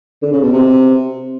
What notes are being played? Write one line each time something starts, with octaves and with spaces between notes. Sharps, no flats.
D3
C#3
B2
C3